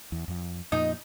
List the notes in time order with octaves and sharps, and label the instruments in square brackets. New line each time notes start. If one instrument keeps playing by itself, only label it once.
[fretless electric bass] E2
F2
[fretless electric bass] F2 A#2 [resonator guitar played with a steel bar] D#4 D#5